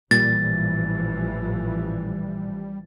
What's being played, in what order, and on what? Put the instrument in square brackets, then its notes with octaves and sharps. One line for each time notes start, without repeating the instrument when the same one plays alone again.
[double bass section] A1 E3 F3 [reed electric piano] A#2 [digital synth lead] G3 [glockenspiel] A6